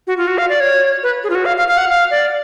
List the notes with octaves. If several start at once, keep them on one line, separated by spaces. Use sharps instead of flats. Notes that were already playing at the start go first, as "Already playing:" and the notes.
F#4
F4
F#4
F5
D5
C#5
B4
G#4
F4
F#4
F5
F5
F5
F#5
F5
D5